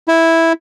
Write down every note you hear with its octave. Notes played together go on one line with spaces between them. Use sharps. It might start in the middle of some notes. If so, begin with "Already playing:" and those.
E4